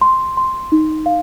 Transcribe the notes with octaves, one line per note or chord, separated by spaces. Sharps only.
C6
C6
D#4
F5